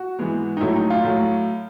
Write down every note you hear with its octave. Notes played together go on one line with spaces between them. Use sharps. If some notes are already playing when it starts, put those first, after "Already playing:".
Already playing: F#4
G#2 E3 G#3 B3
D#4
A2 F#3 A3 E4
D#4
F4
A2 F#3 A3